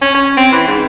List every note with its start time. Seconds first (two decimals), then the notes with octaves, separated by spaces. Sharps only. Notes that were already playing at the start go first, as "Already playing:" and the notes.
0.02 C#4
0.15 C#4
0.37 C4
0.53 E3
0.67 G#2